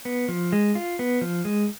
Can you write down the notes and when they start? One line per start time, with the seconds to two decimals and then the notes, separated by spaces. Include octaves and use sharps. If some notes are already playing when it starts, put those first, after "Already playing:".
0.05 B3
0.29 F3
0.52 G#3
0.75 F4
0.99 B3
1.21 F3
1.45 G#3